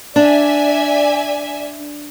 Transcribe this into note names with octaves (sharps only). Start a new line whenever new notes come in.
D4 D5 E5 G#5